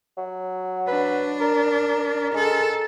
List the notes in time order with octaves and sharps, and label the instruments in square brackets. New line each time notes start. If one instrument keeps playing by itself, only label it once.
[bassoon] F#3
[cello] D4 [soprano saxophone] B4
[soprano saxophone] A#4
A#4
[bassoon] G#3 [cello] A4